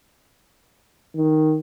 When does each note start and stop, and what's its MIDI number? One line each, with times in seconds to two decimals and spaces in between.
1.16 1.57 51